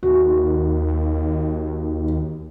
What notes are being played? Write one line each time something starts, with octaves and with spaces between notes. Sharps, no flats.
D#2 F#4